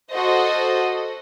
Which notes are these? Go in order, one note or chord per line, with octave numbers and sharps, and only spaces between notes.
F#4 A4 C5 D#5